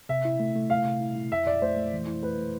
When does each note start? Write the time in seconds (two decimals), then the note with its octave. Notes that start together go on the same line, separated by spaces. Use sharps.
0.09 C3 E5
0.25 E4
0.40 A3
0.56 A3
0.70 A3 F5
0.86 C3
1.01 E4
1.16 E4
1.32 F2 E5
1.47 F2 D5
1.62 A3 C5
1.77 A3
1.93 E3
2.07 E4
2.23 A3 B4
2.37 A3